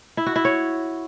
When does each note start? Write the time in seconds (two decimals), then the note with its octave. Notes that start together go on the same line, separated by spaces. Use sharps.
0.17 E4
0.26 F#4
0.36 E4
0.45 C#5